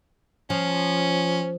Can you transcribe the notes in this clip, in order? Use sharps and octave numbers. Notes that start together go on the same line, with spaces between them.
F3 C#4